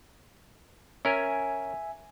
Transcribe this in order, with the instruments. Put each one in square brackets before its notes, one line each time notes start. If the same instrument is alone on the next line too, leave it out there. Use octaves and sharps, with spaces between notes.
[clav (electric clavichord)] C#4 A#4 [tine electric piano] E5 G#5